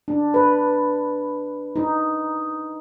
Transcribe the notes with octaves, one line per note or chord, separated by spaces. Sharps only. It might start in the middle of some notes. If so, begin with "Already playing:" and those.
D4
B4
D#4